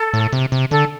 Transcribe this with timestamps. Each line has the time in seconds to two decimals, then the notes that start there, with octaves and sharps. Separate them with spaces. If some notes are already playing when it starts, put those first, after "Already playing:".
Already playing: A4
0.14 A2
0.33 C3
0.52 C3
0.71 D3 A4